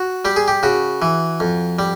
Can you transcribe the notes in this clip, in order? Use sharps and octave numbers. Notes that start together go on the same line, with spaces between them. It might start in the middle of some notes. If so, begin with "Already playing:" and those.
Already playing: F#4
G3 G4
G#4
G4
C#3 F#4
E3
F2
G3